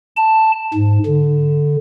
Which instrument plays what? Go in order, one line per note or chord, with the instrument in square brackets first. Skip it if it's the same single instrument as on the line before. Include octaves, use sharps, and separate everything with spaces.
[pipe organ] A5
G#2
D3